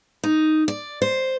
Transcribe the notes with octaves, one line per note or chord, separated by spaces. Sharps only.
D#4
D5
C5